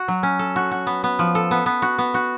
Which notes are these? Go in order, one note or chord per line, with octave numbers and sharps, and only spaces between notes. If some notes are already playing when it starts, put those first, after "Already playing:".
Already playing: F#4
F#3
C#4
A4
F#4
F#4
B3
B3
F3
A4
B3
B3
F#4
B3
F#4